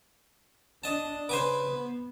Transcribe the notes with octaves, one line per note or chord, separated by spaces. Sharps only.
D4 D#5 A5
C#3 B4 C5 G#5 D6
B3